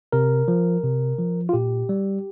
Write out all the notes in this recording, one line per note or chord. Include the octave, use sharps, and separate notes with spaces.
C3 A#4
F3
C3
F3
F4
A#2 G4
G3